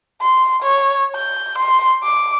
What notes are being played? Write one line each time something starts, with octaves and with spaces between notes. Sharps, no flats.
C6
C#5
G6
C6
D6